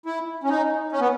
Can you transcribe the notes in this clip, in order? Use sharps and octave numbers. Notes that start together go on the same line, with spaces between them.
E4
C#4
D#4
C#4
B3